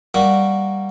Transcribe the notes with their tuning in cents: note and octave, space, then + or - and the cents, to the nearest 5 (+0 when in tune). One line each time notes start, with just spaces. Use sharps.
G3 +0 A#3 +0 F#4 +0